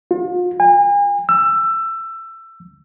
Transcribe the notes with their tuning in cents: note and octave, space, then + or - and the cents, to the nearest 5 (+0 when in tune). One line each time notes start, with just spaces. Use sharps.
F4 +40
G#5 -40
E6 +20